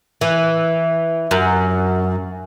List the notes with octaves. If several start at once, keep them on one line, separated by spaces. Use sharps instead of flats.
E3
F#2